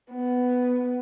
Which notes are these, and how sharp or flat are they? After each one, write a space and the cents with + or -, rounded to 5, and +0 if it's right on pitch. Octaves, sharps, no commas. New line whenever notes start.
B3 +10